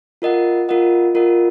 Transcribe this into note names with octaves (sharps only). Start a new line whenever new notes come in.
F4 A#4 D#5 F#5
F4 A#4 D#5 F#5
F4 A#4 D#5 F#5